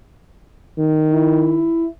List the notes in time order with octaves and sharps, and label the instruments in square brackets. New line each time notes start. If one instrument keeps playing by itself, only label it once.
[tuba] D#3
[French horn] E4